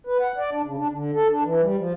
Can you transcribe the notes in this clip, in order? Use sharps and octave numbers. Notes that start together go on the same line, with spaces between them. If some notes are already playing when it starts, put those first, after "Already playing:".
B4
F#5
D5
D4
C#3
D4
D3
A4
D4
E3
G3
F3